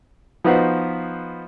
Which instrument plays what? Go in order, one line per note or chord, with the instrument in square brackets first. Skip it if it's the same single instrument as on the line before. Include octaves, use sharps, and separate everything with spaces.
[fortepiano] F3 B3 D#4 F#4 B4 C5